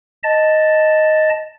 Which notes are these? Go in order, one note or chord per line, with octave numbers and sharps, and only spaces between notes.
D#5 A5 A6